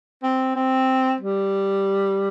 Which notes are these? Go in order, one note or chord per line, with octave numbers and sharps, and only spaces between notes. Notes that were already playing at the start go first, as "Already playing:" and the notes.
C4
C4
G3